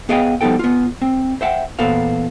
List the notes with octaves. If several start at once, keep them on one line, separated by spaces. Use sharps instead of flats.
B3 G#4 C#5 D#5 F5 G5
F3 G3 B3 D#4 A4 G5
B3 F4
C4
C5 E5 F#5 G5
E2 A#2 B3 A4 C5 F5